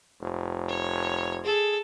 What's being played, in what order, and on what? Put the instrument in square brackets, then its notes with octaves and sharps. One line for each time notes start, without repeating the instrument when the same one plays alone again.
[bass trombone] F1
[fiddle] C#5
[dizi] G#4 [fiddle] A4